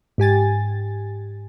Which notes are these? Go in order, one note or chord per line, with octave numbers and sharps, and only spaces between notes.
G#2 G4 G#5 A6